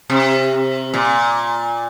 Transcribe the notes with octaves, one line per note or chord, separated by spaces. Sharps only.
C3
A#2